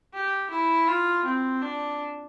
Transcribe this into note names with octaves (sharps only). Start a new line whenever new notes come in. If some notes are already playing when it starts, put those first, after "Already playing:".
G4
E4
F4
C4
D4